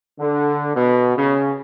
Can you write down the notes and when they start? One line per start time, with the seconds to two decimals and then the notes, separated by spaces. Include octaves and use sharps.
0.19 D3
0.75 B2
1.16 C#3